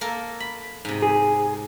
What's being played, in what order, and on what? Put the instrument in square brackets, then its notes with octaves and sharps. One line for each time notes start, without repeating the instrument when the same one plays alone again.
[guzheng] A#3 A4 A#4
B5
G#2 C3
[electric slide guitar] G#4